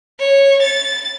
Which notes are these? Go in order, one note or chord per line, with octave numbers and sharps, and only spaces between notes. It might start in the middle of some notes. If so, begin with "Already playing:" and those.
C#5
A6